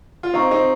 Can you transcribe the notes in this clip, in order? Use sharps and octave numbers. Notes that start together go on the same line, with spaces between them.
F4
C4 D#4 C5 F5 A#5 C#6
C4 D#4